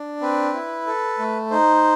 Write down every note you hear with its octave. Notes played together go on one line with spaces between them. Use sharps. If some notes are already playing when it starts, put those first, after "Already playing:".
Already playing: D4
C4 B4
E4
A4
A3
D#4 C5